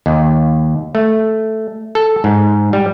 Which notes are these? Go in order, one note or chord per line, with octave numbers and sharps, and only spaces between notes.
D#2
A3
A4
G#2
G3